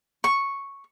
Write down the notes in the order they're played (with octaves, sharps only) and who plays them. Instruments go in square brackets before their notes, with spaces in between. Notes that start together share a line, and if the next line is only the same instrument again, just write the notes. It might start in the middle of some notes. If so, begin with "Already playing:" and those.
[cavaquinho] C#6